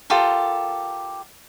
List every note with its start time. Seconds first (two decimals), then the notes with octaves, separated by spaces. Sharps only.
0.10 F4 G4 A4 A#4